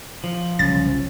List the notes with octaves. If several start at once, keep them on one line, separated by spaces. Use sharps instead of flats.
F3
F#1 C2 C#4 A6